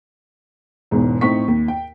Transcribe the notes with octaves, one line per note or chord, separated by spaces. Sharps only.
E1 E2 G#2
A2 C4 D#4 C#6 B6
D#2
G5